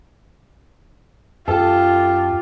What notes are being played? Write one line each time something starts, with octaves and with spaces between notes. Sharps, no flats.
F#2 F4 G4 A4